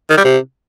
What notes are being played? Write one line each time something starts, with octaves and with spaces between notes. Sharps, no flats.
D#3
G3
C3